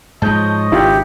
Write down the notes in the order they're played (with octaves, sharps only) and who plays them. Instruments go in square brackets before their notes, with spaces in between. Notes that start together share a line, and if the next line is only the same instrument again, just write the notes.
[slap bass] G#2 F3 [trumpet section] C#5 D#5 [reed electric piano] A5 G6
[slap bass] G#1 C#3 D4 [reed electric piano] E4 F4 [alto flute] G4